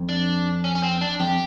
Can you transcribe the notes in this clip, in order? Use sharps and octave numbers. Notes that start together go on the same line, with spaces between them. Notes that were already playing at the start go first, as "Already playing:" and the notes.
Already playing: F2
D4
C#4
C#4
C4
D4
F2 G4